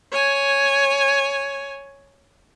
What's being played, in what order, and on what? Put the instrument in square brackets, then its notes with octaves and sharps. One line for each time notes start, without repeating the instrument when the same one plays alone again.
[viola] C#5 G#5